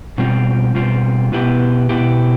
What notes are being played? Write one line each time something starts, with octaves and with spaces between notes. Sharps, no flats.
B2 G3 C4 F4
B2 G3 C4 F4
B2 B3 E4 G4
B2 B3 E4 G4